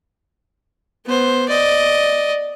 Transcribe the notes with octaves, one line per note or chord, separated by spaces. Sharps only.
B3 C5
D5 D#5